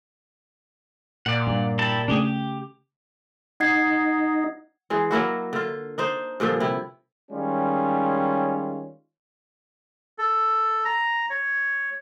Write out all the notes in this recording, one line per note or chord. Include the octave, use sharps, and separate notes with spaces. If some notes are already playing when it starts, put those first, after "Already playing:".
A#2 D5 F#5
G2
E4 G4 A5
C#3 A3 D4 G4 G#4
G4
D#4 F#5 G#6 C7
E3 G#3
F#3 A#3 E4 F#4
D3 F4
D4 D#4 C5
G2 A#2 D3 F3
C3 E4
D#3 G3 G#3 C#4 F4
A4
A#5
C#5